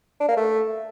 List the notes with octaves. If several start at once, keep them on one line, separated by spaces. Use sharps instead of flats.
D4
A#3
A3